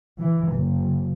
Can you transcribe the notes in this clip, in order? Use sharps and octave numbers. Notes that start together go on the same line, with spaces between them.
E3
F#1